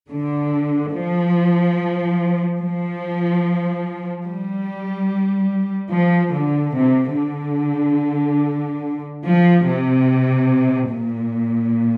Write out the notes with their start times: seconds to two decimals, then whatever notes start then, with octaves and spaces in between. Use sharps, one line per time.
0.10 D3
0.93 F3
2.60 F3
4.25 G3
5.92 F3
6.34 D3
6.75 C3
7.17 D3
9.25 F3
9.67 C3
10.91 A#2